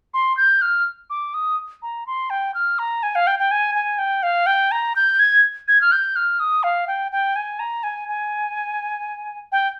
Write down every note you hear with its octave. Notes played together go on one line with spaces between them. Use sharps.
C6
G6
F6
D6
D#6
A#5
C6
G5
F6
A#5
G#5
F5
G5
G5
G#5
G#5
G5
F5
G5
A#5
G6
G#6
G#6
F6
G6
F6
D#6
F5
G5
G5
G#5
A#5
G#5
G#5
G5